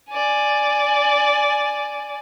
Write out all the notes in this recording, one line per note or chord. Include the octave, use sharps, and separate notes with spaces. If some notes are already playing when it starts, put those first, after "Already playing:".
D5 G#5